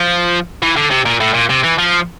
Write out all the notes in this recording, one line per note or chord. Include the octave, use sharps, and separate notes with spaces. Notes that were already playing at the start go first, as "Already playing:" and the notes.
Already playing: F3
E3
D3
C3
A#2
A2
A#2
C3
E3
F3